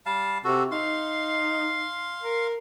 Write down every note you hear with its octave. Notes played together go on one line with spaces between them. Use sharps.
G3 F5 A5
C3 F#4 A4
D#4 F5 C6
A#4